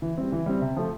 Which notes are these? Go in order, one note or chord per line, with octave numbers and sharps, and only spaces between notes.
E3
G3 C4
E3
G3 C4
C3
F3 A3